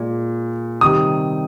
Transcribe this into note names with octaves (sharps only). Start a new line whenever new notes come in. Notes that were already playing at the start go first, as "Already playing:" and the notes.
Already playing: A#2 G#3
C3 D#3 G3 D#6